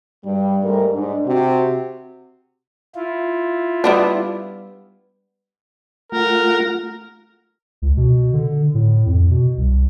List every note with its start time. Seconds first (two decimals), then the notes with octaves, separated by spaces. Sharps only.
0.24 G2 G3
0.63 G#2 G3 A3 A#4
0.93 G#2 D4
1.25 C3 F#4
2.95 E4 F4
3.84 G3 B3 D4
6.12 A3 F4 A#4 F#5
7.82 C#2
7.97 B2
8.33 D3
8.74 A2
9.06 F2
9.30 B2
9.58 C2